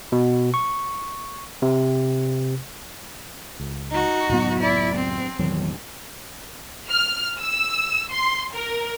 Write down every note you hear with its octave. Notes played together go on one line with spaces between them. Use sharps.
B2
C#6
C3
C#2
D#4 F#4
C#2 F#2 A2 F#3 B3
E4 D5
C4
E1 A1 E2 D#3 F#3
F6
E6
C6
A#4